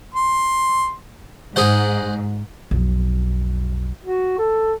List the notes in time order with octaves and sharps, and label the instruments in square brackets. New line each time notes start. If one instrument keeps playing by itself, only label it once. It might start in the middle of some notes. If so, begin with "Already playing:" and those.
[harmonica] C6
[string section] G#2 [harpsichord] G#4 C5 F#5
[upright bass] B1 F2
[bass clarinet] F#4
A4